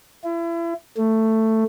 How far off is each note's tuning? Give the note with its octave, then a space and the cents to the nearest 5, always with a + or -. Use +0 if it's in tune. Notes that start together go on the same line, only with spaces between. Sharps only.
E4 +35
A3 +10